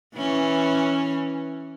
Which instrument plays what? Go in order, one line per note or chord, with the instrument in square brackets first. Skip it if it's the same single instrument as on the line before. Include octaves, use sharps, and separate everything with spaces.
[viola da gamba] E3 C#4